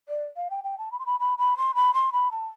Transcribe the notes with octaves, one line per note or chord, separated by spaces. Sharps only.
D5
F5
G5
G5
A5
B5
C6
B5
B5
B5
C6
B5
C6
B5
A5